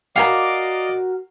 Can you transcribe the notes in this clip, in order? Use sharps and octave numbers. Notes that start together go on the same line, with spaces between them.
F#4 G#4 A#4 D5 D#5 F5 D6